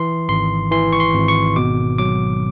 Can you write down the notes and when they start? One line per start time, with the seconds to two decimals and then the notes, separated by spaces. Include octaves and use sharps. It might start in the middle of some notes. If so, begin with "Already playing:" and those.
Already playing: E3 C6
0.29 G#1 C6
0.71 E3 C6
0.93 C#6
1.00 C6
1.14 G#1
1.28 C#6
1.56 B2 D6
1.98 F#3 D6